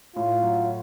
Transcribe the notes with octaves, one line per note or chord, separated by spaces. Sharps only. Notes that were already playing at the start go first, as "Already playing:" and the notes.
A2 F4
F#3